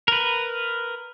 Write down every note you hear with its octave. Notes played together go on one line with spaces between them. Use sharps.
A#4 B4